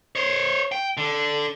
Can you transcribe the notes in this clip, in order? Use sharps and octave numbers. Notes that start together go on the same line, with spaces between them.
C5 C#5
G5
D3